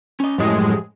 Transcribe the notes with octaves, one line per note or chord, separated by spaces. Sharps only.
C#4 D#5
F#2 A2 F3 G#3 G4 G#4